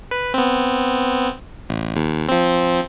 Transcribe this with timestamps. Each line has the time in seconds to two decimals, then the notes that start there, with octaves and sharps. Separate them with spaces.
0.11 B4
0.34 B3 C4
1.69 A1
1.96 D#2
2.29 F3 C4